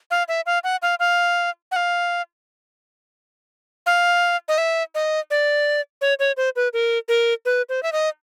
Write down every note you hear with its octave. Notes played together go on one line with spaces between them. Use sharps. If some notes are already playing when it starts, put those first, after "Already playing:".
F5
E5
F5
F#5
F5
F5
F#5
F5
F5
D#5
E5
D#5
D5
C#5
C#5
C5
B4
A#4
A#4
B4
C5
E5
D#5